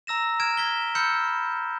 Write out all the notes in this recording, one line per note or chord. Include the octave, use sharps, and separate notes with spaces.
A#5 E6 A#6 E7
F6 G#6 D7 E7
G#6 B6 G7
B5 E6 F6 G6 C#7